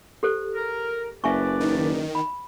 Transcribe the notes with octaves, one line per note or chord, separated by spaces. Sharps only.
G4 A4 C5
A#4
F#1 B4 D5 E5 G#5 C#6
D#3
B5